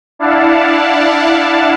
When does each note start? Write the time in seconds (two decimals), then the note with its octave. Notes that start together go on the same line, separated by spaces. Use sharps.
0.19 D4 E4 D5 F5 F#5 A5